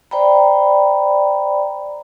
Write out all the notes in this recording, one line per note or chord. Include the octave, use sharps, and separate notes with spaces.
C5 D5 G5 A#5 B5